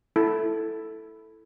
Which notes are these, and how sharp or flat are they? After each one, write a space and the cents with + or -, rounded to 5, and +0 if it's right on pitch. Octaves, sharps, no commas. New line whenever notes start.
E4 +0 A4 +0